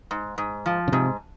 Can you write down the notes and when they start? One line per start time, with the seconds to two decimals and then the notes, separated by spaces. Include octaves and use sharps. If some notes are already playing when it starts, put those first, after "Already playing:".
0.11 G#2
0.38 G#2
0.66 F3
0.88 C#3
0.92 G#2 C3